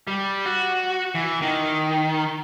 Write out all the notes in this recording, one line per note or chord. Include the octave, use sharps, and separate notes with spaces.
G3
F#4
E3
D#3